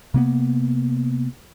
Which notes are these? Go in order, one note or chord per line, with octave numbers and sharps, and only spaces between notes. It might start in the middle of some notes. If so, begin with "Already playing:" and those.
C3 A#3 B3